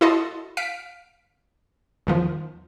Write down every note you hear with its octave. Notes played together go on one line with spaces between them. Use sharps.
E4 F#4 A4 D#5 C6
F5 B6 D7
E2 D#3 F3